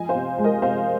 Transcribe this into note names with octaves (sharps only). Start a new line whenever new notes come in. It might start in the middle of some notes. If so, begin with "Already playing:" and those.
Already playing: F3 D#5 G#5
C5 F5
C3
G#3
A#4 D#5
C3 C5 F5